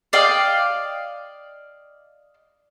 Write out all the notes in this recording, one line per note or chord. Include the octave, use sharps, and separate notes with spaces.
D5 D#5 F5 G5